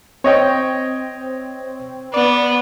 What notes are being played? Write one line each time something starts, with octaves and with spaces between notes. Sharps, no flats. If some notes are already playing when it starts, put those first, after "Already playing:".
C4 C#5 D#5 G5
B3 D5